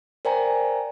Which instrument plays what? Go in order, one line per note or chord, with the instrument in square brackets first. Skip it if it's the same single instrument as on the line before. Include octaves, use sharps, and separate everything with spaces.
[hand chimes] A#4 C5 D5 G5 G#5 A#5